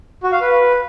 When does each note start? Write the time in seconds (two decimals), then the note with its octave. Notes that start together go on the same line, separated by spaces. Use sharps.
0.23 F#4
0.32 F5
0.41 B4